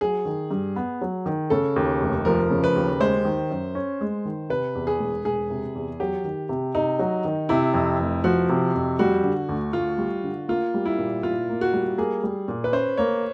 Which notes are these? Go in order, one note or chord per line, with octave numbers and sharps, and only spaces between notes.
F#3 G#4
D#3
G2
B3
F#3
D#3
C#3 A4
D#2
F1
F3 A#4
C#3
B4
D#2
G#3 C5
D#3
F#2
C#4
G#3
D#3
C3 B4
E2
G#4
E1
E1 G#4
C3
E2
F#3 G4
D#3
C3
C3 D#4
F#3
D#3
C3 E4
F2
F1
F3 F#4
C3
F2
G3 F#4
D3
D2
D2 F4
G3
D3
A#3 F4
G3
E4
A#2
A#2 F4
A#3
F#4
G3
A#3 G#4
G3
A#2
B4
C#4 C5
A#3 C#5